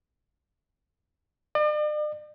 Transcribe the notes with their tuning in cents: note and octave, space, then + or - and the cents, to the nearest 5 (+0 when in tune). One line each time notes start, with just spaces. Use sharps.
D5 +45